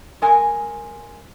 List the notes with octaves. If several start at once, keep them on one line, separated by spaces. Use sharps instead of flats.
G#3 A#4 G#5